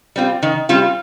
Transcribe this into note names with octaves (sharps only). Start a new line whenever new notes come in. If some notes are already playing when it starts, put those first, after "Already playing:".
G3 C4 F4
D#3
G3 C4 F4